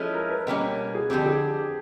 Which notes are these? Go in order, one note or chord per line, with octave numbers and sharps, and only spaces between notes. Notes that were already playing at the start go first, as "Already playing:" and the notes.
Already playing: F3 G#3 C#4 E4 A4
A#4
B4
B2 G3 A#3 C#4
G#4
F2 D3 G3 C4 G4
G#4